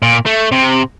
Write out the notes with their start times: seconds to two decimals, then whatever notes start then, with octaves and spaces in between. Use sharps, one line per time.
0.03 A#2
0.26 A3
0.52 C3